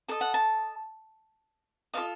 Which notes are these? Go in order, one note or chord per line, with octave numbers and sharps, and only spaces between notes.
A4 D#5 A5
F#5
A5
F4 A4 C5 D#5 F5